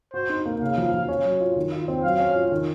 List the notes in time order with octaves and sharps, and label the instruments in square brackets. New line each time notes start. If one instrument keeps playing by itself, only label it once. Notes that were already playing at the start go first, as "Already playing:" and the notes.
[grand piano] F#4 [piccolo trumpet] C5
[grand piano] D#4
A#3
[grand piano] C#3 [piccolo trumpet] F5
[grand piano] F3
F3
C#4
F#3
F4
D#3
F4
C4
[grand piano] F#3 [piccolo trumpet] F5
[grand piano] C#4
F4
D#3